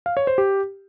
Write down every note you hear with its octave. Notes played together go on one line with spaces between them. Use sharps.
F5
C#5
C5
G4